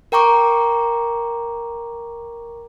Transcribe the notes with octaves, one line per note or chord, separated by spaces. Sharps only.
A#4 G5 A#5 C#6 D6